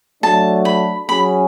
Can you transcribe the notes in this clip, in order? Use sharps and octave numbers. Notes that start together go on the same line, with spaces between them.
F#3 A3 D4 A5
B5
F#3 C#4 G#4 B5